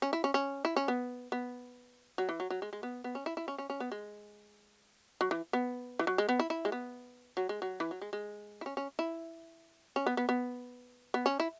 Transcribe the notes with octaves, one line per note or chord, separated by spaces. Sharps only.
C#4
E4
C#4
C#4
E4
C#4
B3
B3
F#3
E3
F#3
F#3
G#3
G#3
B3
B3
C#4
E4
E4
C#4
C#4
C#4
B3
G#3
F#3
E3
B3
E3
F#3
G#3
B3
E4
E4
G#3
B3
F#3
G#3
F#3
E3
F#3
G#3
G#3
E4
C#4
C#4
E4
C#4
B3
B3
B3
B3
C#4
E4